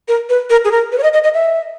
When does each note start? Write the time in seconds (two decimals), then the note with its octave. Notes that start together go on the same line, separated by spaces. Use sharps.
0.08 A#4
0.29 B4
0.50 A#4
0.65 G#4
0.71 A#4
0.92 B4
0.98 C#5
1.03 D#5
1.13 D#5
1.24 D#5
1.34 E5